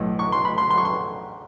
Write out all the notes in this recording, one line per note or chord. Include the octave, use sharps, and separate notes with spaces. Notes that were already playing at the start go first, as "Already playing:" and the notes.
Already playing: B1 A2 E3
C#6
C6
B5
C6
C6
C#6
C6